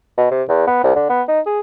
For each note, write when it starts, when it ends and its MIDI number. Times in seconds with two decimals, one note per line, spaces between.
0.18 0.28 47
0.31 0.43 48
0.49 0.66 40
0.67 0.83 59
0.84 0.92 36
0.96 1.06 50
1.10 1.23 59
1.28 1.40 63
1.46 1.60 68